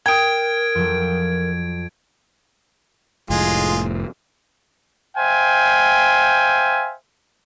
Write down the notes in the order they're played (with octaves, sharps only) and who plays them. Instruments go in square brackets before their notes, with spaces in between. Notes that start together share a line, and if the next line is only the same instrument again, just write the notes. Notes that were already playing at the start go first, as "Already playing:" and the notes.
[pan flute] A#4 [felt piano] G5 D#6 [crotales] G#6 D7
[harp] F2 F#3
[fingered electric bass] F1 A2 [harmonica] G#3 F4 G#4
[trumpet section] C5 E5 F5 G5 G#5